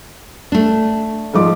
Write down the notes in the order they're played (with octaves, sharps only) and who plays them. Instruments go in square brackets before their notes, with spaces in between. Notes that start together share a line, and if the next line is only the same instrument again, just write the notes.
[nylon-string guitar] A3 D4
[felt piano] G#2 F3 D6